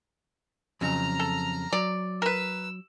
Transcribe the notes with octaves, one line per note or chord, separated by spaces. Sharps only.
F2 C#3 F#3 A#5 F6
A4
F#3 D5
A#4 B4 E6